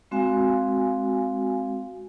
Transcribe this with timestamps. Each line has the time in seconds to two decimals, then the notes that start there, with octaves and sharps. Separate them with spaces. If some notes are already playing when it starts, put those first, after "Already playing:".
0.11 G#3 C4 F#4 F5 G#5